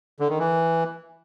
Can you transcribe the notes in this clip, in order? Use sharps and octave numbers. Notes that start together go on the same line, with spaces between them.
D3
D#3
E3